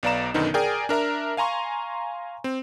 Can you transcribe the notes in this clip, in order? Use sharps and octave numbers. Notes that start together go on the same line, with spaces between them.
B1 B3 D5 F5 A#5 E7
F#2 B2 D3 D#3 B3 D#4
G#4 A#4 D5 G5 G#5
D4 A#4 E5 A#5
F5 G#5 A#5 C6 C#6
C4